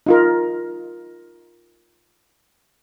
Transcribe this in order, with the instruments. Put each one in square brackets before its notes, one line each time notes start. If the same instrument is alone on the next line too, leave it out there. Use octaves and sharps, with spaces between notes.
[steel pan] D#4 F4 A#4